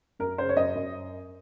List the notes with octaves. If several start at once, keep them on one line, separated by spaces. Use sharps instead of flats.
F#2 A#4
C#3 C5
C#5
F#2 D#5
F#2